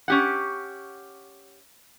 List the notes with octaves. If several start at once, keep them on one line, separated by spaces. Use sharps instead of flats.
C#4 G4 F#5